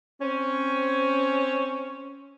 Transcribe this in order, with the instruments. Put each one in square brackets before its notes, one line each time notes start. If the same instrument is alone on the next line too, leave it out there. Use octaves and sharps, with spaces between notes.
[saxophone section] C4 C#4